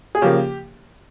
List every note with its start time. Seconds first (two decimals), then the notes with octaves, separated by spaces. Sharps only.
0.15 G#4
0.22 C#3 F3 A#3 G4